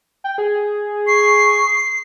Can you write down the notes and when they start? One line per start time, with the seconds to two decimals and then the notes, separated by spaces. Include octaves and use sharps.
0.24 G5
0.38 G#4
1.07 C#6 C7